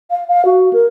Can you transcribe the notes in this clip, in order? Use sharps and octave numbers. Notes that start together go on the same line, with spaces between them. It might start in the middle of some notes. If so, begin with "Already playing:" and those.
F5
F5
F#4
A#4